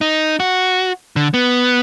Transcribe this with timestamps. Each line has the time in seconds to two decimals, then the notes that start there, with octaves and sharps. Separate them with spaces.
0.01 D#4
0.40 F#4
1.16 D3
1.34 B3